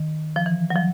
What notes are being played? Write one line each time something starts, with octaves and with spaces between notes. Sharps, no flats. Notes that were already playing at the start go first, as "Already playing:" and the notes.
Already playing: D#3
F3
E3
F#3
F3